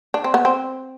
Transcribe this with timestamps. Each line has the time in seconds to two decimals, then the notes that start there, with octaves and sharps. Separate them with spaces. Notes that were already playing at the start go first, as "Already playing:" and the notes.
0.14 D4
0.24 C4
0.34 B3
0.45 C4